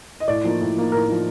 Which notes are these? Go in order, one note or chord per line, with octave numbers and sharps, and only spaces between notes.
D#5
A2 D5
F3 A#3 D#4
A2
F3 A#3 D#4
A2 A#4
F3 A#3 D#4